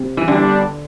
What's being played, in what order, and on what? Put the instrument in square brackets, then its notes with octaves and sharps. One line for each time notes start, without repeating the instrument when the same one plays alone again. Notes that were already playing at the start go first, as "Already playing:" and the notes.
Already playing: [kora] C3
E3
[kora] D3 [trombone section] G3 B3 D4